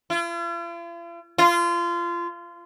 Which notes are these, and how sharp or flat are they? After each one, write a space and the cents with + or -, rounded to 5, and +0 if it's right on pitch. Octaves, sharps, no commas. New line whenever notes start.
F4 -45
F4 -25